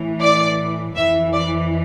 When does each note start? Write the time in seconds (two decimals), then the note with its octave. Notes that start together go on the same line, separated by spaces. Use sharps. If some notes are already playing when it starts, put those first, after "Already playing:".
Already playing: A2 E3
0.21 D5
0.96 F2 E3 E5
1.33 D5